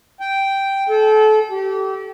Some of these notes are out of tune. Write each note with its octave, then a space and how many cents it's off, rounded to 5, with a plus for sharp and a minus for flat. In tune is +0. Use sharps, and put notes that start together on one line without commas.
G5 -5
A4 -30
G4 -30